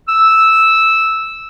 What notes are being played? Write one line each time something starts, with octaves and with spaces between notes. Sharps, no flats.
E6